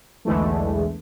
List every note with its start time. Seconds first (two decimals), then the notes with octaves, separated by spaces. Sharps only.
0.25 B1 E2 D3 E3 G#3 A3